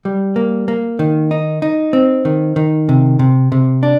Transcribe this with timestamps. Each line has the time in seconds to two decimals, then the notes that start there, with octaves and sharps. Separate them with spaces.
0.05 G3
0.36 A#3
0.68 A#3
0.99 D#3
1.31 D#4
1.62 D#4
1.93 C4
2.25 D#3
2.56 D#3
2.89 C3
3.19 C3
3.52 C3
3.83 D4